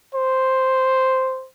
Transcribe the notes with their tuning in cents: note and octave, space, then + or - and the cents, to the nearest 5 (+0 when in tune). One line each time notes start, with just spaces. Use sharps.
C5 +0